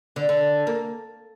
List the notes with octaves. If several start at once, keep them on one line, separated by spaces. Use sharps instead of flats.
D3
D3
A#3